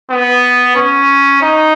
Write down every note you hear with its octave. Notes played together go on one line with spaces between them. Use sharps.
B3
C#4
D#4